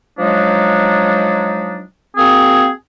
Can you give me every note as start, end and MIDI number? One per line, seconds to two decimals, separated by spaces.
0.18 1.82 53
0.18 1.82 54
0.18 1.82 56
0.18 1.82 62
0.18 1.82 63
2.17 2.67 58
2.17 2.67 60
2.17 2.67 66
2.17 2.67 68